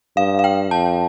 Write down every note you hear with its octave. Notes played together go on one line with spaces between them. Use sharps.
G2 F5
F5
G5
F2 A5